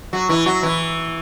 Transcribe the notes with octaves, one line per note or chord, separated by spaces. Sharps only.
F#3 F#4
E3 E4
F#3 F#4
E3 E4